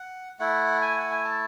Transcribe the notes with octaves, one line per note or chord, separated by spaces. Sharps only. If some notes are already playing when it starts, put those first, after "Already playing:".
Already playing: F#5
A3 E4 F#5
G#5
F#5
G#5
A5